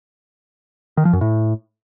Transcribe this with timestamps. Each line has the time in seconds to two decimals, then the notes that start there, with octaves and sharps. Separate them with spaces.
0.97 D#3
1.05 F3
1.13 F#2
1.21 A2